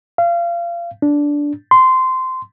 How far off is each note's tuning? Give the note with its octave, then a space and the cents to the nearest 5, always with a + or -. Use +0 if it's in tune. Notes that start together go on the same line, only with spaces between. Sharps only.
F5 -30
D4 -10
C6 -15